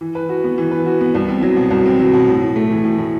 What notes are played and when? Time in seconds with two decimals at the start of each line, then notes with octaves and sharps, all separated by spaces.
0.01 E3
0.15 B4
0.29 F#4
0.44 B3
0.58 E3
0.71 B4
0.86 F#4
1.01 B3
1.14 C2
1.29 C4
1.42 F#3
1.57 B2
1.71 C2
1.86 C4
1.99 F#3
2.13 B2
2.28 A2
2.41 A2
2.56 A3
2.71 E3
2.84 A2
2.98 A2